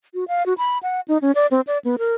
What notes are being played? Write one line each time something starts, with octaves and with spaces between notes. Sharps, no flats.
F#4
F5
F#4
B5
F#5
D#4
C#4
D5
C4
D5
B3
A#4